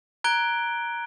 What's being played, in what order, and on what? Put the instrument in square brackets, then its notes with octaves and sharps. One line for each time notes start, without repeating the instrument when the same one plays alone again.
[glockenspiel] A#5 F#6 G#6 D7 G7